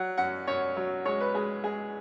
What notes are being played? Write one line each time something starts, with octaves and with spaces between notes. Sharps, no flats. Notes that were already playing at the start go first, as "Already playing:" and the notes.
Already playing: F#3 F#5
F#2 F#5
F#2 C#5
F#3
G#3 C#5
B4
G#3 G#4
G#3 G#4